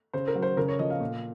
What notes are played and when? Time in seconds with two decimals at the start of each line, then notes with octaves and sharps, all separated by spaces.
0.13 C#3 C5
0.28 A#4
0.35 F#3
0.42 C5
0.57 C#3 A#4
0.68 C#5
0.79 F3 D#5
0.90 F5
1.00 A#2